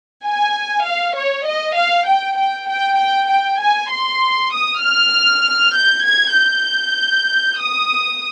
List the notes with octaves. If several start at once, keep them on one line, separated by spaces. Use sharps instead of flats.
G#5
F5
C#5
D#5
F5
G5
G5
G5
G5
G5
G#5
C6
D#6
F6
G6
G#6
G6
D#6